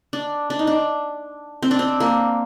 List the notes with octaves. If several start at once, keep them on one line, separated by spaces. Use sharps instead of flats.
D4
D4
D#4
D4
C4
D4
C4
A#3